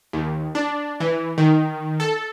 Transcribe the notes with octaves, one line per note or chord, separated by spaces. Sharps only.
D#2
D4
E3
D#3
A4